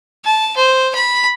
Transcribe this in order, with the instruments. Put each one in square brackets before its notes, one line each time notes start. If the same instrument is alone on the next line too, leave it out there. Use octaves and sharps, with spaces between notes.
[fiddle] A5
C5
B5